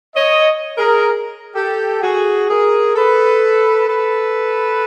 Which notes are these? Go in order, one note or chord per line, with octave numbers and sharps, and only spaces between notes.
C#5 D#5
G#4 A#4
G4 A4
F#4 G#4
G#4 A#4
A4 B4
A4 B4